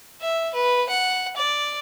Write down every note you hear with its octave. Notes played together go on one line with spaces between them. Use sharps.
E5
B4
F#5
D5